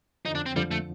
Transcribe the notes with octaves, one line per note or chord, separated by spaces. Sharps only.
F2 D3 F3 D#4
D4
C4
F2 D3 F3 G3
A3